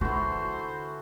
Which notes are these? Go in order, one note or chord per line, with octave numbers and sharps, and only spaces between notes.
D3 E3 F#4 A4 C5